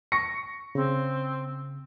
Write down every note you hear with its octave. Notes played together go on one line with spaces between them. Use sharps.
C#6 A#6 C#7
C#3 C4